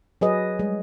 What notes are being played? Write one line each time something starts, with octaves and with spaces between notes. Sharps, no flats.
F#3 G#4 B4 D#5
G3 G#3